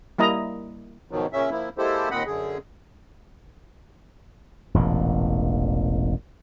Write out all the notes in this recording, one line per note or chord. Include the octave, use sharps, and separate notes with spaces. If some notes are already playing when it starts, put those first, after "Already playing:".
G3 A#3 E4 D#5 A#5
G#2 B2 D#3 F3 F#3
A#2 C#3 C#4 E5
F3 A#3 E4
G#3 A#3 E4 G4 A4 C5
D#2 A#2 C4 D#5 F#5 B5
F#2 D3 G#4
E1 A1 A#2